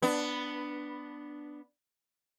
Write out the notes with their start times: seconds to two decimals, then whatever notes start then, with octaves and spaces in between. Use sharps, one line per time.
0.02 B3 D4